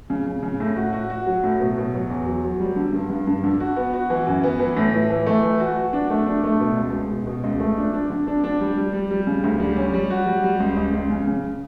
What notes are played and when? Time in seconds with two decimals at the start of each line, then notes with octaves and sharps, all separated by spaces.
0.10 C#3
0.26 C#3
0.43 C#3
0.60 A2
0.76 F#4
0.93 F#4
1.10 F#4
1.26 F#3
1.43 A2
1.60 B2
1.77 B2
1.94 F#3
2.10 E2
2.26 F#3
2.44 F#3
2.60 G3
2.76 D3
2.93 G2
3.10 G2
3.27 G2
3.43 D3
3.60 F#4
3.76 B3
3.93 F#4
4.10 E3
4.27 F#2
4.43 B3
4.60 E3
4.77 A2
4.94 E4
5.10 E3
5.26 A3
5.43 E3
5.60 F#4
5.76 F#4
5.93 D4
6.10 A3
6.26 D4
6.43 A3
6.60 B2
6.77 C#2
6.93 C#2
7.10 B2
7.26 B2
7.44 C#2
7.60 A3
7.77 D4
7.93 D4
8.10 D3
8.27 D4
8.44 D4
8.61 G3
8.77 G3
8.93 G3
9.11 G3
9.27 C#3
9.44 D2
9.60 G3
9.76 C#4
9.93 G3
10.10 F#4
10.26 G3
10.44 G3
10.60 C#2
10.77 C#2
10.93 C#2
11.10 C#3
11.27 C#3